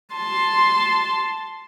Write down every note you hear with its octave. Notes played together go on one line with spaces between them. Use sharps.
A5 C6